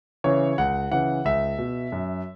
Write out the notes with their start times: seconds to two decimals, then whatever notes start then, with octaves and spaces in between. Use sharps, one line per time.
0.24 C#3 E3 C#5
0.58 C#2 F#5
0.92 C#3 E3 F#5
1.25 C#2 E5
1.58 B2
1.92 F#2